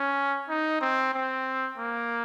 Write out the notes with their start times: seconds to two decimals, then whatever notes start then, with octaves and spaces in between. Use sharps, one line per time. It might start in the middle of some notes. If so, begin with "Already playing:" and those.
Already playing: C#4
0.49 D#4
0.81 C4
1.14 C4
1.78 A#3